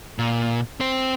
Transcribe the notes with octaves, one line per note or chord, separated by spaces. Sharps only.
A#2
C4 C5